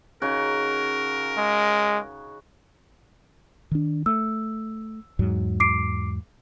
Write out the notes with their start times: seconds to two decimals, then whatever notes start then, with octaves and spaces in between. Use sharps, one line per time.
0.22 C#3 D#4 F#4 A#4
1.38 G#3
3.71 D#3 D4
4.06 A3 E6
5.19 E2 G#2 F#3
5.60 D6 C7 D7